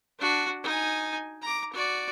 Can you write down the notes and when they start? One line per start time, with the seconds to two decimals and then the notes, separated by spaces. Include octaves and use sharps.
0.19 D4 F#4
0.63 D#4 G#5
1.42 A#5 D6
1.73 F#4 D5